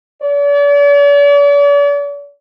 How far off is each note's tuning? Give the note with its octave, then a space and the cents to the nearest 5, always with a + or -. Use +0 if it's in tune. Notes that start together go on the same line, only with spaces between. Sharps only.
D5 -45